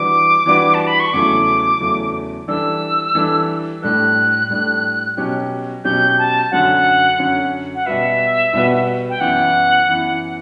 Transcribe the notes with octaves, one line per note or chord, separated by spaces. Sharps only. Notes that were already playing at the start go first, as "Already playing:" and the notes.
Already playing: E3 G3 D4 F#4 B4 D6
E3 G3 D4 F#4 B4
A5
B5
C#6
E2 C#3 F#3 A3 E4 D6
E2 C#3 F#3 A3 E4
E3 G3 D4 A4 E6
E3 G3 D4 A4
A2 G3 D4 A4 F#6
A2 G3 D4 A4
B2 F#3 C#4 G4
B2 F#3 C#4 G4 G6
A5
F#2 D3 F#3 C#4 F#4 F#5
F#2 D3 F#3 C#4 F#4
F#5
B2 G3 B3 F#4 B4 E5
B2 G3 B3 F#4 B4
G5
F#2 E3 B3 E4 F#5
F#2 E3 B3 E4